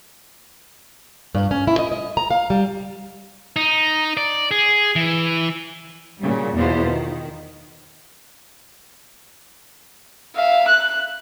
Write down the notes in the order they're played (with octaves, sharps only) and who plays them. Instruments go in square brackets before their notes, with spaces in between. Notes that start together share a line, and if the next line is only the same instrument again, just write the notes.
[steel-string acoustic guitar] G2
C#4
E4
D#5
D#5
A#5
F5
G3
[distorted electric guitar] D#4
D5
G#4
E3
[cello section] A#2 C#3 F#3 G3
E2 B2 E3 B3 F4 C5
D#3
[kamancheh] E5 F5
F#6